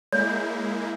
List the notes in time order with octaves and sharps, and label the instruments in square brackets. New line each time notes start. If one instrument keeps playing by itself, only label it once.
[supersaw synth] G#3 A#3 E4 [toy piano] C#5 [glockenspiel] G6